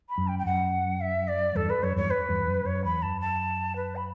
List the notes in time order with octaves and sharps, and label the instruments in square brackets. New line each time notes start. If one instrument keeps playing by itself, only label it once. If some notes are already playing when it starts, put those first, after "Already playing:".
[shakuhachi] B5
[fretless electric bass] F#2
[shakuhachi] G5
G5
[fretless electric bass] F#2 [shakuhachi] F#5
[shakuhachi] E5
D5
[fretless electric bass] E2 G2 [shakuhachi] A4
[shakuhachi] B4
[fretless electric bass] F#2 [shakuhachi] C#5
[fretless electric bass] E2 G2 [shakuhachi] C#5
[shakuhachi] B4
[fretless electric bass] E2 G2
F#2
[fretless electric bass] F#2 [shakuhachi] C#5
[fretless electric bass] E2 [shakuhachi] B5
[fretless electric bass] F#2 [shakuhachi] A5
[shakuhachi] A5
B4
B5